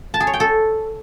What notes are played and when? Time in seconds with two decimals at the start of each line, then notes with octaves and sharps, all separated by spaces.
0.14 A5
0.20 G#4
0.27 C#5
0.34 G5
0.40 A4